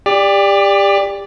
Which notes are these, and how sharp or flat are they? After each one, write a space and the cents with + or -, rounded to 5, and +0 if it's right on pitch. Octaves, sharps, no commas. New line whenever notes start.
G4 +30 D5 +0